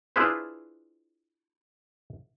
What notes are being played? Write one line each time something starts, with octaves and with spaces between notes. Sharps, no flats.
D4 E4 F4 G#4 B4 C5